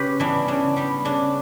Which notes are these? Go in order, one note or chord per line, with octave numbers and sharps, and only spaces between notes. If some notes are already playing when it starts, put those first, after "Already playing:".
Already playing: C#3 G4 B4
E3 G3 B3 D4
C#3 D4
G3 B3
C#3 D4